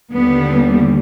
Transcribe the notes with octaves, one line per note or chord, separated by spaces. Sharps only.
D#2 D3 G3 B3